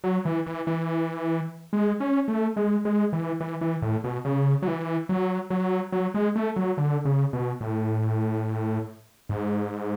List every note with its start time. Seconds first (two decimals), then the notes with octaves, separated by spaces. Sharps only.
0.04 F#3
0.25 E3
0.46 E3
0.67 E3
1.73 G#3
2.00 C#4
2.28 A3
2.57 G#3
2.85 G#3
3.13 E3
3.40 E3
3.61 E3
3.82 A2
4.04 B2
4.25 C#3
4.62 F#3
4.67 E3
5.09 F#3
5.50 F#3
5.92 F#3
6.14 G#3
6.36 A3
6.56 F#3
6.78 D3
7.05 C#3
7.33 B2
7.61 A2
9.29 G#2